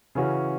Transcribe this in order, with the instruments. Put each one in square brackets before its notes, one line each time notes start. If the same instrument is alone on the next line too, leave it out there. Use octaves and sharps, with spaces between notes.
[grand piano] C#3 E3 C#4 F#4